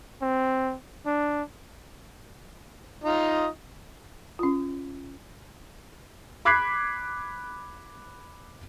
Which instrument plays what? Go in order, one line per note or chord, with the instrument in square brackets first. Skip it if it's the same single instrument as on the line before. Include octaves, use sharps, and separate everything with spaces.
[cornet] C4
D4
[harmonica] D#4 F4 D#5
[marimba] C#4 F4
[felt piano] B5 D6 F#6 G#6 B6 C7